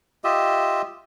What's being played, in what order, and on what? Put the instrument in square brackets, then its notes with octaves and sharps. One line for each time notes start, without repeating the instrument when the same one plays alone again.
[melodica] F4 G4 D#5 E5